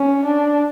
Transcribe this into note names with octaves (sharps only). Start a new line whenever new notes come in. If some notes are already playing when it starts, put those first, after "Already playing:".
Already playing: C#4
D4